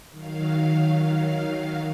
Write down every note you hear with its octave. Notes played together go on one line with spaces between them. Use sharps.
D#3 F#3 F5